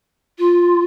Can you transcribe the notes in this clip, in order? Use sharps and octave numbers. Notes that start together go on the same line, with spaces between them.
F4